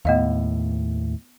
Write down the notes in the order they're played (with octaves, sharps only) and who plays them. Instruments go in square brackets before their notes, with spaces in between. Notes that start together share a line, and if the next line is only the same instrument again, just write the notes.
[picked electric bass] D#2 A2 [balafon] B3 D#5 F5